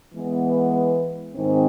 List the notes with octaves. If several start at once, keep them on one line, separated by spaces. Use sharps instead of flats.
E3 G#3 B3
G#2 D#3 G#3 C4